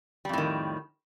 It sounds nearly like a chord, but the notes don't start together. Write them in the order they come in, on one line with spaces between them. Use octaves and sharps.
G3 F2 A2 D#3